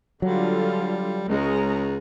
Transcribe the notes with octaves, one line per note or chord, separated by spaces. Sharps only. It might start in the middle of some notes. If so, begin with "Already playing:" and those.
D3 F#3 G3 F4
C#2 G#3 C#4 A#5